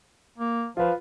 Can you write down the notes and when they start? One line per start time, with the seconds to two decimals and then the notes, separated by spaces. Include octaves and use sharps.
0.38 A#3
0.77 F3 F4 B4